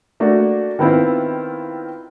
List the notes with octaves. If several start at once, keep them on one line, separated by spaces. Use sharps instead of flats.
A3 A#3 D4 F#4
D#3 B3 C4 E4 F4